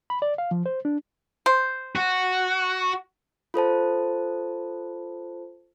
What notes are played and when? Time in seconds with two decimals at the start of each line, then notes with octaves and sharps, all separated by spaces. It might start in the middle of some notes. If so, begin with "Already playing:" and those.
0.10 B5
0.22 D5
0.38 F5
0.51 F3
0.66 C5
0.85 D4
1.46 C5
1.96 F#4
3.54 F4 A4 C5 A5